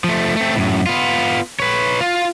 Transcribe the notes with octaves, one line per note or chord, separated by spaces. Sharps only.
F3 A3
A3 C4
F#2 A2
B3 F4
B4 C#5
F4